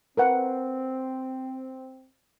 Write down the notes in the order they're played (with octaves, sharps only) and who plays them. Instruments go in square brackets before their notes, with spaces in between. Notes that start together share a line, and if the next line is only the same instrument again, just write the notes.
[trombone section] C4 [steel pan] A#4 B4 F#5